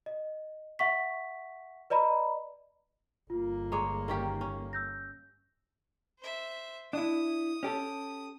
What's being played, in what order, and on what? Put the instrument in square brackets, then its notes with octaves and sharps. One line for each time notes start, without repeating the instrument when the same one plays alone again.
[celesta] D#5
E5 F#5 C#6 B6
B4 D5 D#5 A#5 B5
[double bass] G1 A#3 [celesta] F4
[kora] G#3 C#5 [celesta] A#5 D6
[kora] D#3 C#4 G4
C#4
[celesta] E6 G6 A#6
[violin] C5 E5
[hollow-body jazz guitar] D4 E4 [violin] D#6
[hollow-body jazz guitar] C#4 G4 A4